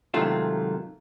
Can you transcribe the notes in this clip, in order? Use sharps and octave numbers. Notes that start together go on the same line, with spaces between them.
G#2 C3 D#3 F#3 A3 F4